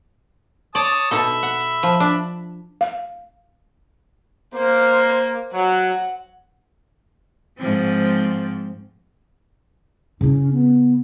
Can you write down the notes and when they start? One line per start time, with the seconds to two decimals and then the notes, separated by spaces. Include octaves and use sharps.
0.75 C#5 D5 A5 D#6
1.11 B2 D#4 A4 E5 B5
1.43 F#5
1.83 F3
2.00 D4
2.81 F5
4.54 A#3 C5
5.53 F#3 F#5
7.58 G#2 F3 C4
10.21 C#3 C#4 E4
10.53 B3